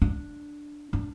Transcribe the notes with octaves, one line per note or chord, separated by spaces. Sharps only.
D4
D4